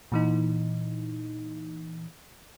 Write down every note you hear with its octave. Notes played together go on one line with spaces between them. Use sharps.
A#2 E3 D#4